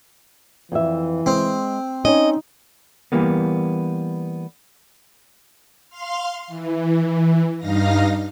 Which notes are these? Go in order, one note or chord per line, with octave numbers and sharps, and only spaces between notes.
F2 E3 E5
G#3 C4
C#4 D#4 C#5 D#5
E3 G3 A#3 B3
F5 C6 F6
E3
G2 D#4 F5 A#6